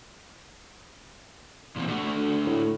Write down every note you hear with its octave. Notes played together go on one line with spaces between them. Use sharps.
A#2 E3 C4
A3 D4 F#4
D3
A2